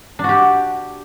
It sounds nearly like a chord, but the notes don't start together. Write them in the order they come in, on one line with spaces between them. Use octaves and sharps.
D4 F#4 G4